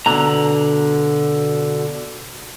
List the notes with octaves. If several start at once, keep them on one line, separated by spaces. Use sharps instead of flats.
B2 D3 A#5